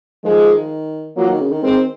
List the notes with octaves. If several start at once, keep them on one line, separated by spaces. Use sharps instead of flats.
D#3 F3 G#3
F3 F#3 A#3
D#3
C#3
D#3
D#3 G#3 C4